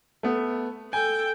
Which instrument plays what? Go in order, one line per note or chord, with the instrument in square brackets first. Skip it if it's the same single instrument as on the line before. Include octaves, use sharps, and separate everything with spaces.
[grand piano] A3 B3
[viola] A4 G5 [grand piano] G#5